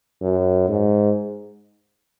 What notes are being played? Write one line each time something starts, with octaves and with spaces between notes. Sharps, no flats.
F#2
G#2